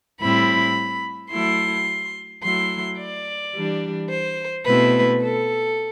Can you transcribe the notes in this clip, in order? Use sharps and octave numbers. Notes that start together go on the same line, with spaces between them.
A2 G3 C4 E4 B5
F#3 A3 E4 C6
F#3 A3 E4 C6
D5
E3 G3 D4
C5
B2 A3 C4 E4 B4
A4